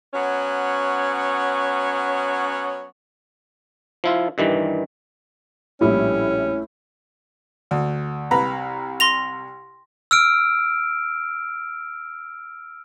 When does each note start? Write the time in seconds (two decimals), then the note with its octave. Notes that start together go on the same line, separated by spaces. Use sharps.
0.13 F#3 B3 C#4 C#5
4.04 F3 E4 F4
4.38 G2 D#3 E3 G3
5.81 A#1 A2 G3 C#4 E4 G4
7.71 D2
8.31 C2 B4 A#5
9.00 C6 A#6 F7
10.11 E6 F6 D7